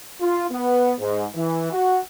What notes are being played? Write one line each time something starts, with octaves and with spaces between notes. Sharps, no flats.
F4
B3
G#2
E3
F#4